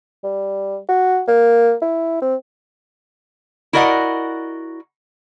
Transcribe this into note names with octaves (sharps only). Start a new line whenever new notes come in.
G3
F#4
A#3
E4
C4
E4 F#4 A#4 D5 D#5 F#5